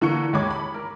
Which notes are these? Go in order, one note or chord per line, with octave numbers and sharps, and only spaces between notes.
D3 E3 A#3 C#6 C#7
D#2 G#3 C#5 B5 D6 G#6
B5
A#4